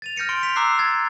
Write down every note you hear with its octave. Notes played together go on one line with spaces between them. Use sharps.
A6 D#7 F7
F6 G6 A#6 C#7 D#7
C6 D7 G7
B6 F7
A#5 D6 E6 F#6 C7
A#5 G#6 A6